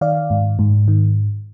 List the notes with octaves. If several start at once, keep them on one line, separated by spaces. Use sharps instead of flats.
D#3 D5 F5
G#2
G#2
D#3